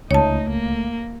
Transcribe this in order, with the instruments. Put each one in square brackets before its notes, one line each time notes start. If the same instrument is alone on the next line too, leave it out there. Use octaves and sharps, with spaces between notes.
[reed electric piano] C#2 [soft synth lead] A3 [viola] D#4 [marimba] C#5 A5
[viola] A#3